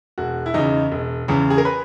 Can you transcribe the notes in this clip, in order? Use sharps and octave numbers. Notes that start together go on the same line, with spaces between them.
E1 F#4
E4
E2 C#3 D#4
E1
E2 C#3
G#4
A#4
B4